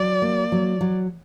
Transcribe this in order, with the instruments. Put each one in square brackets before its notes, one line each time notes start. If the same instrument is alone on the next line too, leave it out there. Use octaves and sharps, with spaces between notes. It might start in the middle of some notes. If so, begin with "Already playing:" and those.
Already playing: [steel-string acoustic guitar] F#3 [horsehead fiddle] D5
[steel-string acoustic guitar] A#3
F#3
F#3